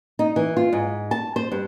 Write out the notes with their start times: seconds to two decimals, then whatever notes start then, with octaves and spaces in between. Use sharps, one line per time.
0.19 D#4
0.36 E3
0.57 F4
0.73 G#2
1.11 A5
1.36 C5
1.52 G2